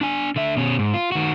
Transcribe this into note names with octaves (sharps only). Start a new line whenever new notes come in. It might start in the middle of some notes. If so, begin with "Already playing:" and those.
D4 G#5
D3 E5
B2 C#4
G#2
F4
D#3 F#4